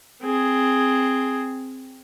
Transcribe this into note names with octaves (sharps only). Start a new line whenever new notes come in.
C4 G#4